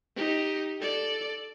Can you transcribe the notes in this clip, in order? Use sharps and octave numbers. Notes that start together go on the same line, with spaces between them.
D#4 G4
A4 D5